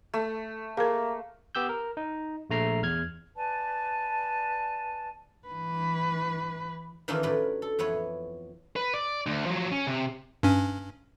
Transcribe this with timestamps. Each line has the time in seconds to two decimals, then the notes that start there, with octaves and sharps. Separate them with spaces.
0.14 A3
0.77 A#3 G#4 A#4
1.55 B3 G4 E6 G6
1.69 A#4
1.97 D#4
2.50 A#1 A3 A#5 C7
2.82 E2 F6 G#6
3.35 B4 D5 G#5 A5
5.48 E3 B4
7.08 D#3 E3 A#3 C#4 D4 F4
7.23 A2 F#3 B4 D5
7.62 A4
7.79 F2 E3 B3 C#5
8.76 B4
8.94 D5
9.27 D2
9.46 F3 F#3
9.71 C#4
9.87 C3
10.43 G2 C#4